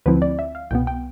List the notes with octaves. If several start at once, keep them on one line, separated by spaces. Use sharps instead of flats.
D2 D3 F3 C4 E4 B4
D5
E5
F5
C2 B2 B3 G5
G5